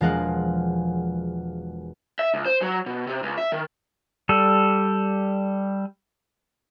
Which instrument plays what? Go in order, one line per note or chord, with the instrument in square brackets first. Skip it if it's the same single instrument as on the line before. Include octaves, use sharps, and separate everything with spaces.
[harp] E1 F3 G#3 A#4 F5 F#5
[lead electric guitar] E5
C#2
C5
F#3
B2
C3
C#2
E5
D#3
[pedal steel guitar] G3 A4